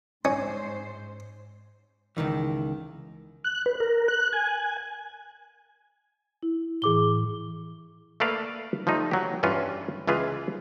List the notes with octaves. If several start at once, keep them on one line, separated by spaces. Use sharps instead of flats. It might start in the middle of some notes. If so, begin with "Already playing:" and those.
G#2 C#4 C5
C#2 G#2 D#3 E3
F#6
B4
A#4
F#6
G#5
E4
A2 E3 G#4 D6 G7
A3 A#3 A4 B4 D5 F5
F3 G3 A3 D#4
F#3 G4
G2 E3 C#4 F4
C#2 E3 F4 G#4 B4